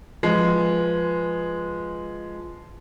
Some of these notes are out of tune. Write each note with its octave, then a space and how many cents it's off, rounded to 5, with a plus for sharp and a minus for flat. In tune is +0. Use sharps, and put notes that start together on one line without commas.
F3 +0 G#3 +0 B4 +0